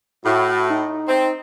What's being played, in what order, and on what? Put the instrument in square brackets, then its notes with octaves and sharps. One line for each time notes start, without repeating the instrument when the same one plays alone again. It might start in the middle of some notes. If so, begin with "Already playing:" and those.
[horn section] A2 [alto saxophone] F#4
[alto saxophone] D#4
[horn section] C4